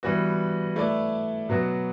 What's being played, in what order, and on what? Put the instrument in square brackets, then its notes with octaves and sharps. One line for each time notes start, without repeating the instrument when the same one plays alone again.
[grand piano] E3 G3 B3 F#4
A3 E4 B4 D5
B2 F#3 B3 F#4